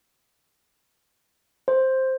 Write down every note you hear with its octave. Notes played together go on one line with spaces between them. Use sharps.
C5